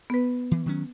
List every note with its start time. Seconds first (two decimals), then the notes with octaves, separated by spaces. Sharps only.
0.10 B3 B4
0.51 E3
0.66 D#3 F#3 C#4